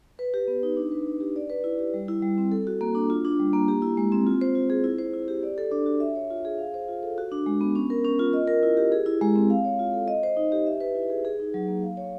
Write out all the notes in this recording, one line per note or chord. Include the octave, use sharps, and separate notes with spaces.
B4
G4
B3
D#4
D4
B4
D4
G4
D5
B4
E4
G4
G3
E4
G3
C4
A4
F#4
A#3
D4
F4
D4
G3
A#3
G4
E4
G#3
C4
F4
C5
F4
G#4
E4
C5
E4
G4
D5
A4
D4
F#4
E5
C#5
F4
G#4
F5
C5
F4
A4
F#4
D4
G#3
B3
C#4
A#4
C#4
F4
D#5
A#4
E4
G4
G#4
E4
G#3
C4
F5
C#5
F4
A4
D#5
C5
D#4
G4
E5
B4
E4
G#4
G#4
D#4
F#3
A#3
F5
C#5